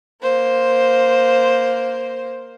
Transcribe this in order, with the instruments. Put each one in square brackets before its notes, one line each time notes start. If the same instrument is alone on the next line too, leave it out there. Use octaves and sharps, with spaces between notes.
[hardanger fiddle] A#3 C5